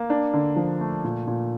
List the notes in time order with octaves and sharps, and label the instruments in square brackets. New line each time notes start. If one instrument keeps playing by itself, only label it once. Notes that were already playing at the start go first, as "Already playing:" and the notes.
Already playing: [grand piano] A#3
D4
D3
F3
A3
A#2
A#2